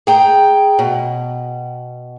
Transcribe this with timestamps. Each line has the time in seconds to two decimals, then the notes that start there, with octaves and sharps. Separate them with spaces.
0.07 G#4 G5 A#5
0.79 B2